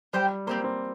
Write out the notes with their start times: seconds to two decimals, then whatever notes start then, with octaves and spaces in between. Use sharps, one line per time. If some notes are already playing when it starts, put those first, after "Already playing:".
0.13 G3 G4 C5 G5
0.47 A#3 C4 G4 C5
0.64 C4